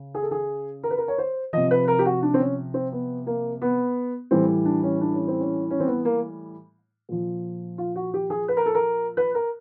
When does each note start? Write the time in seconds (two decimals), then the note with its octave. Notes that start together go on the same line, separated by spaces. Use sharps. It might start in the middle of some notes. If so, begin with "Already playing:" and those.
Already playing: C#3
0.15 G#4
0.23 A4
0.31 G#4
0.83 A#4
0.90 B4
0.98 A#4
1.08 C#5
1.18 C5
1.53 C3 F3 D#5
1.71 B4
1.88 A#4
1.99 G4
2.05 F#4
2.22 D4
2.34 C4
2.40 C#4
2.74 C4
2.92 B3
3.27 A#3
3.62 B3
4.31 A2 E3 G3 C4
4.65 D4
4.83 C#4
5.01 D4
5.14 C#4
5.28 C4
5.40 C#4
5.71 C#4
5.80 C4
5.87 B3
6.05 A#3
7.09 A#2 F3
7.78 F4
7.95 F#4
8.14 G4
8.30 G#4
8.48 B4
8.57 A#4
8.66 A4
8.75 A#4
9.17 B4
9.35 A#4